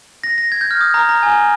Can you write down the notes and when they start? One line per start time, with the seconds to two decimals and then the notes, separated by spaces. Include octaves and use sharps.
0.24 A#6
0.38 A#6
0.52 G#6
0.61 G6
0.71 F6
0.81 D#6
0.94 A#5
1.09 A#5
1.23 G#5